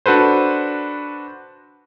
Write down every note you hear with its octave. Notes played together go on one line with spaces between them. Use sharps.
D4 F#4 A4 B4 C5